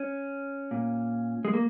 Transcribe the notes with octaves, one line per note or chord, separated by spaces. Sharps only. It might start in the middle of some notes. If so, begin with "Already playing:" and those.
Already playing: C#4
A#2
G#3
A#3